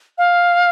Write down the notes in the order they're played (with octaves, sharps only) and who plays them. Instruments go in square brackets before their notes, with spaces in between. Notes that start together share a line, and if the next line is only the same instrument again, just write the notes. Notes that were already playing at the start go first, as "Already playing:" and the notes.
[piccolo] F5